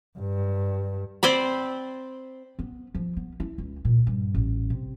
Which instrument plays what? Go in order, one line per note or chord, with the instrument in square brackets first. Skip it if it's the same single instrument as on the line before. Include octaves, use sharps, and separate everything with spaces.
[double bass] G2
[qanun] C4 C5 D5 B5
[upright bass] B3
F3
B3
E4
C#2
A#2
G2
A1
C3